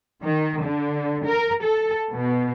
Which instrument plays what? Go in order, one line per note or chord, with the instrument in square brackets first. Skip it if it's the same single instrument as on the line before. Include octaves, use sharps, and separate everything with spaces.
[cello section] D#3
D3
A#4
A4
B2